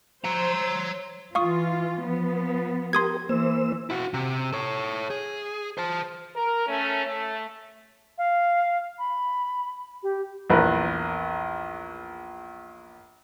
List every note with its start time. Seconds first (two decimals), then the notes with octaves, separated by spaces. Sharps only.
0.25 C5 C#5 A#5
1.35 E3 F4 F5 C#6 D#6
2.01 F3 B3
2.93 G4 A#4 C6 D#6 G#6
3.29 E3 A#3 C5 E6
3.90 E4 F#4
4.14 C3
4.53 A4 C#5
5.10 G#4
5.78 C5 A5
6.36 A#4
6.67 A3 C#4
7.05 A3
8.18 F5
8.99 B5
10.03 G4
10.50 A#1 E2 A#4 B4